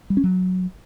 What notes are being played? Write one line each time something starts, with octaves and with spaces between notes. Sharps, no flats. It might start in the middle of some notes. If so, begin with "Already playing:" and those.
G3
C#4
F#3